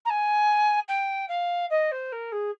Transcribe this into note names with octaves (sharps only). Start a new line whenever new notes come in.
A#5
G#5
G5
F5
D#5
C5
A#4
G#4